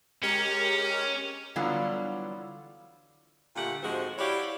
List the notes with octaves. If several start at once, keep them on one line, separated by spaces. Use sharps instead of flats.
G#3 C#4 G4 A#4
D3 E3 F#3 G3 B3 F4
A#2 D3 A3 F4 G4 F#5
G#2 F3 G#3 C4 F#4
E4 F#4 G4 C#5 D5 F5